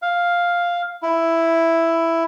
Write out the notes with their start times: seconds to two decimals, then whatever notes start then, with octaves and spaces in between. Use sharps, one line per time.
0.02 F5
1.02 E4